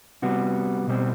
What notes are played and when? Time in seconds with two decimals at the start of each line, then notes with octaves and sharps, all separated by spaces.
0.22 C2 C3 G3 B3 F#4
0.87 B1 B2 G3 C4